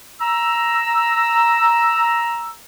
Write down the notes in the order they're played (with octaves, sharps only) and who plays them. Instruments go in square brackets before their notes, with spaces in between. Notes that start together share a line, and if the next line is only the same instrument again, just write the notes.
[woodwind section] A#5 E6